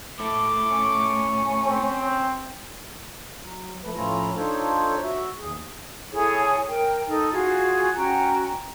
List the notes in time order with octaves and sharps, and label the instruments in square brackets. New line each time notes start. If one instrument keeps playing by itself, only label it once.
[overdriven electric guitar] A3 E4 [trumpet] D6
[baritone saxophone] C#4
[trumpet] C4
[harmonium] F#3
F3 A3 B4
A2 F3 C#4 E4 F4 A#5
D4 D#4 F4 A4 C5 C#5
F#4 E5
D#2 G#4
[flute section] E4 G#4 A4 C#5
A#4 G5
D#4 A4
F4 F#4 G#4
C#4 F#4 G5 A#5